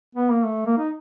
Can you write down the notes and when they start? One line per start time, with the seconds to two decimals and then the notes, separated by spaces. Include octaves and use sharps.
0.15 B3
0.30 A#3
0.44 A3
0.66 A#3
0.78 D#4